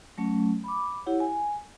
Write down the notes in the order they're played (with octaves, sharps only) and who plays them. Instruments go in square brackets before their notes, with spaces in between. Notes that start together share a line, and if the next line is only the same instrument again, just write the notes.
[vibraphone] F#3 A3 C#4
B5 D6
E4 G4 C#5 F#5
G#5